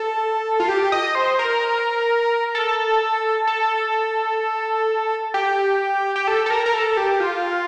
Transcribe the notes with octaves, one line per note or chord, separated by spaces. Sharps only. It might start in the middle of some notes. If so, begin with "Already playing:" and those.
Already playing: A4
F4
G4
D#5
C5
A#4
A4
A4
G4
G4
A4
A4
A#4
A#4
A4
G4
F4